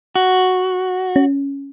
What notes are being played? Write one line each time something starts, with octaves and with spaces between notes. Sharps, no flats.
F#4
C#4